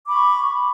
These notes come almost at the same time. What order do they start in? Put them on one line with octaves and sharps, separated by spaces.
D6 B5 C#6